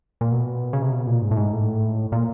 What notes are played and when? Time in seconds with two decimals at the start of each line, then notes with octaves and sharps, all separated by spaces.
0.21 A#2
0.32 B2
0.73 C#3
0.82 C3
0.92 B2
1.07 A#2
1.22 G#2
1.31 A2
1.36 G#2
1.52 A2
2.12 A#2